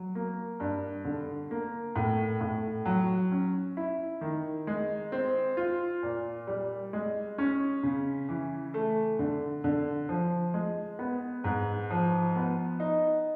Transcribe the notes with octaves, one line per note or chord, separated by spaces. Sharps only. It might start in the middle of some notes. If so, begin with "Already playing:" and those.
Already playing: F#3
A#3
G2
D3
A#3
A2
A2
F#3
C#4
E4
D#3
G#3
C4
F4
A#2
G3
G#3
C#4
C#3
E3
A3
D3
D3
F3
G#3
B3
G#2
F3
B3
D#4